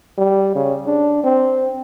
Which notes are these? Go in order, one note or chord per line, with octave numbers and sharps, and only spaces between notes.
G3
C#3
D4
C4